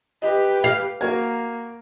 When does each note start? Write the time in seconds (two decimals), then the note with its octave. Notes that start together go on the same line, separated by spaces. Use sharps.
0.22 G4 B4 D#5
0.64 F5
1.01 A#3 F#4 A#4 G#6